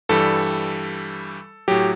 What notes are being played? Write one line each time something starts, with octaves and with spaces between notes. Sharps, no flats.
G2 E3 G3 A4
A2 F#3 G4